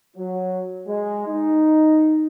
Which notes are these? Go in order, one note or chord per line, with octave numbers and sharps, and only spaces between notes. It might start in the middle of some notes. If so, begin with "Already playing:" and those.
F#3
G#3
D#4